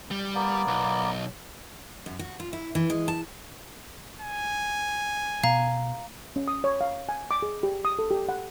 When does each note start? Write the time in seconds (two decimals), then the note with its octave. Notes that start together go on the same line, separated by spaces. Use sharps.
0.11 G3
0.35 A#3 B3 D5
0.67 B1
2.06 F#2
2.19 F#4
2.40 F4
2.53 E4
2.75 E3
2.90 G#3
3.08 A5
4.21 G#5
5.44 B2 F5 A#5
6.36 C#4
6.48 D#6
6.64 C#5
6.81 F5
7.09 G#5
7.31 D6
7.42 G#4
7.63 G4
7.85 D#6
7.99 A4
8.11 G4
8.29 F#5